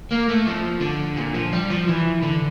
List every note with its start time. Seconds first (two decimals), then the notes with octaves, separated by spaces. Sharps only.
0.11 A#3
0.29 A3
0.47 F3
0.81 D3
1.17 A#2
1.34 F3
1.53 G3
1.70 F3
1.88 E3
2.23 D3